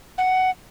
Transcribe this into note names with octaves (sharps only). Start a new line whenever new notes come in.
F#5